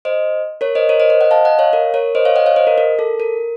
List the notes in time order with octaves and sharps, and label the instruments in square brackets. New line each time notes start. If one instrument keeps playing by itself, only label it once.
[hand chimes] C5 D#5
A#4 C#5
C5 D#5
A#4 C#5
C5 D#5
C5 D#5
D#5 F#5
F5 A5
D#5 F#5
C#5 F5
A#4
A#4 C#5
C5 D#5
C#5 F5
D#5 F#5
C#5 F5
C5 D#5
A#4
A#4
A4
A#4